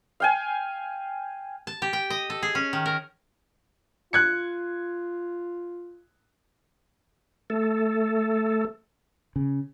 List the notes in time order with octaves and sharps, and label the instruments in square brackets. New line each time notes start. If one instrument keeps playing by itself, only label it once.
[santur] F5 G5 G#5
[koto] A5
G4
G5
D#5
A4
G#4
C#4
D#3
A#4
[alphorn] F4 [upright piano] F#6 G#6 C#7
[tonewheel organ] A3 A4
[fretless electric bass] C#3